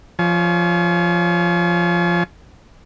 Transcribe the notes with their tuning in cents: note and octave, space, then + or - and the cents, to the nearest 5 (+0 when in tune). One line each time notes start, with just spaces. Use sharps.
F3 -10 C#5 +0 G#5 +40